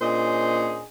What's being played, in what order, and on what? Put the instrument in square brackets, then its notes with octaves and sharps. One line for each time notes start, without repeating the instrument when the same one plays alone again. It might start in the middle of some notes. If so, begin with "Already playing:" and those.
[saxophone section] A#2 C#4 D4 G#4 C5 D#5